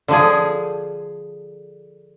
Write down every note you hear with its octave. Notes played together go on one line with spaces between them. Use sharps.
D3 F3 G#4